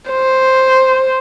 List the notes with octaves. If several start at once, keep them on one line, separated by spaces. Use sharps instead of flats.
C5